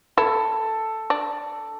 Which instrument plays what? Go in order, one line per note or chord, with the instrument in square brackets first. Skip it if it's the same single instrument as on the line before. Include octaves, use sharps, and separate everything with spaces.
[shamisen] E4 [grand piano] A4
[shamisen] D4